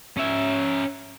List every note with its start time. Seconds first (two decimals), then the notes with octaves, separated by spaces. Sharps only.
0.17 C#4 E5